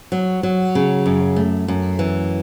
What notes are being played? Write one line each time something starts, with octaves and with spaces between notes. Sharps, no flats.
F#3
F#3
C#3
F#2
A3
F#2
E3